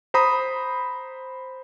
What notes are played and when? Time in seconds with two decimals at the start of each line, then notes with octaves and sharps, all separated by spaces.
0.14 C5 A#5 B5 D#6